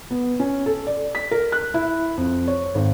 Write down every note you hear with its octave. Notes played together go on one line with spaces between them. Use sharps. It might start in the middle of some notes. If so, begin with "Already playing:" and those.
B3
C#4
A4
D5
B6
A#4
F#6
E4
F2
C#5
G#1